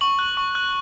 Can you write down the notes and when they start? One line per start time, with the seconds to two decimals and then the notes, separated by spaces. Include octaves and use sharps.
0.01 C#6 F#7
0.19 F#6
0.37 C#6
0.55 F#6